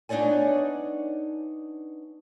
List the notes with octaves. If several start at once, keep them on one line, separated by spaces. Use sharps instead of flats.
B3 D4 D#4 C#5 D5 G#5